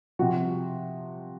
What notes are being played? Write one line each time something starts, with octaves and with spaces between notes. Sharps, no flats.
C3 F3 F#4